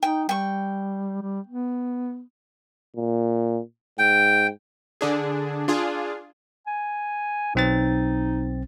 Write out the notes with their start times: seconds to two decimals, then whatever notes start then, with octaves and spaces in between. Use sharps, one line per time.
0.03 D#4 G5
0.29 G3 G5 C#6
1.22 G3
1.47 B3
2.96 A#2
3.99 G#2 G5
5.01 D3 D4 G#4
5.68 D4 F4 G#4
6.67 G#5
7.55 B1 C4 D#4 A6